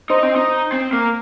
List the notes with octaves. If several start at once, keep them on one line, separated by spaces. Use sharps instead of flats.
D#4 C5 D#5 C6
C4
D#4
C4
A#3